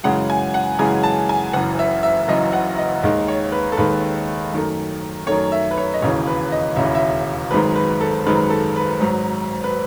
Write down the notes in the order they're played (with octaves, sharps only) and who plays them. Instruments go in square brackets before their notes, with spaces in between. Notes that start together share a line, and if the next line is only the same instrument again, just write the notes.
[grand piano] F#2 C#3 E3 G#3 F#5
G#5
F#5
F#2 C#3 E3 G#3 G#5
A5
G#5
F#1 F#5
F#2 E3
E5
E5
F#1 F#2 E3 D#5
F#5
D#5
D#2 D#3 G#3 D#5
C#5
B4
A4
D#2 D#3 G#3 B4
F#2 D#3 A3
F#2 D#3 A3 C#5
E5
B4
C#5
D#5
E1 D#2 C#3 E3 C#5
B4
D#5
E1 D#2 C#3 E3 E5
E5
G#1 F#2 D#3 G#3 B4
B4
A4
G#1 F#2 D#3 G#3 B4
A4
B4
G#1 G#2 F#3
B4